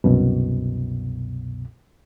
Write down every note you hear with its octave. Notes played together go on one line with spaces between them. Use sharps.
C2 F#2 B2